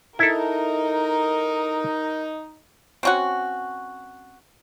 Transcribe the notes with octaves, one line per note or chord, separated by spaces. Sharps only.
D#4 E4 A4 A#4
C4 C#4 F#4